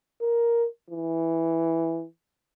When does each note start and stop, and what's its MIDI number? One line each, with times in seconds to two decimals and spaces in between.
0.22 0.66 70
0.90 2.05 52